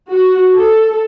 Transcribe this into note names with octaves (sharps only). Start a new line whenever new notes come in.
F#4
A4